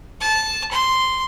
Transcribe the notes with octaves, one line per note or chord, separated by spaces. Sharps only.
A5
C6